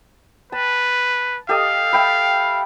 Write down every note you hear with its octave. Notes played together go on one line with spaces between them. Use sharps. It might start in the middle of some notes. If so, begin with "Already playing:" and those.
B4 A5
G4 A4 D#5 F5
E5 G5 B5